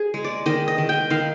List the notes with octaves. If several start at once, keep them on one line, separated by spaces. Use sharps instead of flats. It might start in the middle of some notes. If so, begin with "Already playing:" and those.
Already playing: G#4
G#3
D5
D#3 D#5
D#5
D#3
G5
D#3 F5